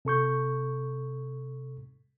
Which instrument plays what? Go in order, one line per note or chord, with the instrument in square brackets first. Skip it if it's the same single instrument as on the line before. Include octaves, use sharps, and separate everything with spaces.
[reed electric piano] C3 A4 C#6 G6